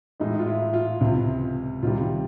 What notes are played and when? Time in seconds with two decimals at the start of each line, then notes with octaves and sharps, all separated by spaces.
0.20 A2 E3 G#3 D#4
0.39 F4
0.47 E4
0.74 F4
1.01 C#2 C3 E3
1.83 C#2 C3 D#3 G3 F4